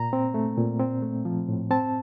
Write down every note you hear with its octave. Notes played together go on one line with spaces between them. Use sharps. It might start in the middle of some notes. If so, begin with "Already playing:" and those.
Already playing: A#2 A#5
C4
A3
A#2
C4
A3
F3
A2
C4 A5